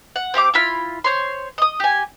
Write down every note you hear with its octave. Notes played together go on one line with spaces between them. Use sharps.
F#5
C4 G4 F5 D6
E4 F4 B5 F6
C5 C#5 C6
D#5 D#6
G4 G#5